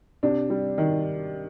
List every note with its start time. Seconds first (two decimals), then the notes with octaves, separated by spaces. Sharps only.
0.23 C3 D4
0.50 G3
0.78 D#3